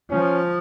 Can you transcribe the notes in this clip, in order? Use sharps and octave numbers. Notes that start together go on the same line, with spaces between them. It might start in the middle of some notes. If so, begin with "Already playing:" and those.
F3 C#4